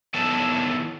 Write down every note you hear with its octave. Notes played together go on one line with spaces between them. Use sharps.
D#3 B3 E4 A4 C#5 A5